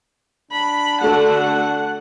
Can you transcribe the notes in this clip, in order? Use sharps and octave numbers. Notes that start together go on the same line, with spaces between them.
D4 B5
D3 A3 F#4 F#5